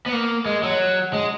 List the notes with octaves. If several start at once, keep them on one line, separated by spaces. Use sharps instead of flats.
B3
A#3
G#3
F#3
G#3